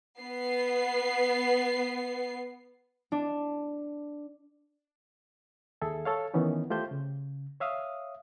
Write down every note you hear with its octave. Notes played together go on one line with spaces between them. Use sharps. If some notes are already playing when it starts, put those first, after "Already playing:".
B3 C7
D4
D#2 G#4 A4 E5
A4 C#5 F5
D#3 E3 B3 C#4 D#4
A3 F4 G4 C5 G6
C#3
C#5 E5 F5 D#6